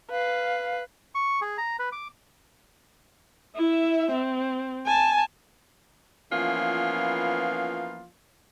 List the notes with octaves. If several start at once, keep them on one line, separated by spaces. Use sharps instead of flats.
B4 F5
C#6
G#4
A#5
B4
D6
E4 E5
C4
G#5 A5
E3 F3 A#3 B3 C#4 F4